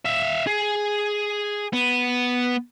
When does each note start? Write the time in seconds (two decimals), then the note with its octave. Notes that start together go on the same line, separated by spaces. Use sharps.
0.05 E5 F5
0.47 G#4
1.73 B3